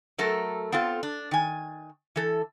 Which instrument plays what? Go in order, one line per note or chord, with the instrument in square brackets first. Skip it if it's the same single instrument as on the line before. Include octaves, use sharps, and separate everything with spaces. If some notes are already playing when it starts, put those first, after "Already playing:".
[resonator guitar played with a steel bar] F#3 A3 A4 A#4
B3 C4 F4 A4
D4
D#3 G#5
E3 A4